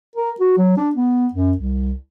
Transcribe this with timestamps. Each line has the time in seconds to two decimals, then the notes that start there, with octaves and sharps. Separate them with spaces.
0.15 A#4
0.40 F#4
0.57 F#3
0.77 D4
0.95 B3
1.33 F#2
1.57 C2